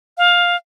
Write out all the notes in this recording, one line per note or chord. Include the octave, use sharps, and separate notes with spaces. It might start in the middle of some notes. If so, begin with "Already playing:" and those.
F5